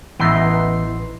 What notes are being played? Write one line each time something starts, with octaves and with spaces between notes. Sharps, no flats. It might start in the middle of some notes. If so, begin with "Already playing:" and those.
A1 E3 B3 D#4 E5 C6 C7